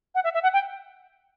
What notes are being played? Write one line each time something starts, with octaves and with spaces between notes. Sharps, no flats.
F#5
E5
E5
F#5
G5